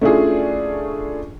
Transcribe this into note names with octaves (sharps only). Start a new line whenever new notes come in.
A3 C#4 D4 E4 F4 G#4